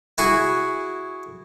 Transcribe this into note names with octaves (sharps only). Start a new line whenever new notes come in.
E4 F#4 G#4